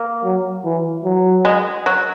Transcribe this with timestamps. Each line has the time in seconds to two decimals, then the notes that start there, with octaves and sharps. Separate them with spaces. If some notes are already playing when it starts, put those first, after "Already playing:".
Already playing: A#3
0.25 F#3
0.65 E3
1.04 F#3
1.45 G#3
1.86 F#3